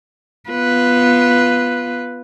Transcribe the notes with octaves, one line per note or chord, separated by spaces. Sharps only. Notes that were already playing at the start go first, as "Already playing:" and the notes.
B3 F4 B4